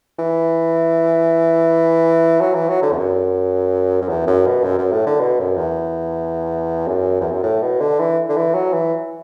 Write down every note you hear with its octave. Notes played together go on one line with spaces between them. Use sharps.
E3
F#3
E3
F#3
D3
E2
F#2
F#2
E2
F#2
B2
F#2
F#2
A2
D3
B2
F#2
E2
F#2
E2
F#2
A2
B2
D3
E3
D3
E3
F#3
E3